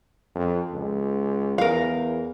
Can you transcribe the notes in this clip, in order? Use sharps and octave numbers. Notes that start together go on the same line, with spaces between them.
F2
C#2
E2 A#4 F5